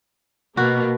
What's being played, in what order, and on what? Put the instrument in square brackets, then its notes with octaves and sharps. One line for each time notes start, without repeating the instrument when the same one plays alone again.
[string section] B2 A#3 [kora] F#4